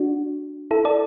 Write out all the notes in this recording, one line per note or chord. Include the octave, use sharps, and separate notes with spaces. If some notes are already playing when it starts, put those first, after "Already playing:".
Already playing: D4 F#4
E4 A4
A4 D5